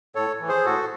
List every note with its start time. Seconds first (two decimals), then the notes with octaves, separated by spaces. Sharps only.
0.15 A2 A4 C#5
0.40 E3
0.49 G#4 C5
0.65 A2 F#4 A4